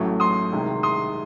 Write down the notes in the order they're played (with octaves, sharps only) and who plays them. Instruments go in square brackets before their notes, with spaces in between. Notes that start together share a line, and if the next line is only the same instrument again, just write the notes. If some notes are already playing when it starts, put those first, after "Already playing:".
Already playing: [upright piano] A1 A2 F#3 A3
C6 D#6
C2 C3 D#3 G#3
C6 D#6